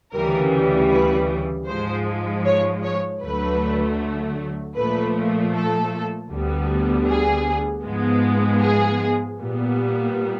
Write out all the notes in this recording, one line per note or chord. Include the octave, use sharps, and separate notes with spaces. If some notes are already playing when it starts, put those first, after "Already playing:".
D2 C#3 E3 G3 A#4
B4
G#2 F3 G#3 C5
C#5
C#5
D2 D3 F#3 A3 B4
A#2 F3 A3 B4
A4
D2 D3 G3 B3
G#4
G#2 F3 G#3 B3
G#4
A#2 G3 B3